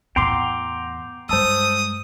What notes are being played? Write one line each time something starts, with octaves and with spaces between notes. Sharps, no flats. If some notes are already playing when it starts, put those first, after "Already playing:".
E2 A2 B3 G5 A#5 C6 D6
G2 G#3 C5 A5 D#6 E6